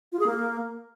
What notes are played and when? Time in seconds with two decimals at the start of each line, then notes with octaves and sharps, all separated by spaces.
0.12 F4
0.19 G#4
0.26 A#3